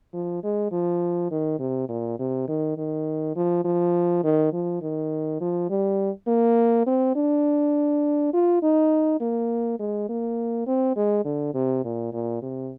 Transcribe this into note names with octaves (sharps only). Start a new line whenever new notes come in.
F3
G#3
F3
D#3
C3
A#2
C3
D#3
D#3
F3
F3
D#3
F3
D#3
F3
G3
A#3
C4
D4
F4
D#4
A#3
G#3
A#3
C4
G#3
D3
C3
A#2
A#2
C3